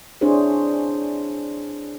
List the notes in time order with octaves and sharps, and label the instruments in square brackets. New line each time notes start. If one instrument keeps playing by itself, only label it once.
[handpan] C4 D4 E4 G#4 C5 C#5